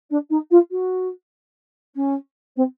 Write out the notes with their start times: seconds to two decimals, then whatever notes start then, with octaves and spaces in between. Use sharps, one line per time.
0.10 D4
0.30 D#4
0.51 F4
0.71 F#4
1.95 C#4
2.56 C4